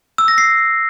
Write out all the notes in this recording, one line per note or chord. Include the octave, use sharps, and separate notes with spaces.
E6
A#6
C7